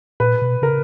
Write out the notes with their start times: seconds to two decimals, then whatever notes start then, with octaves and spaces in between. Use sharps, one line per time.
0.20 A#2 B4
0.42 B2
0.62 C#3 A#4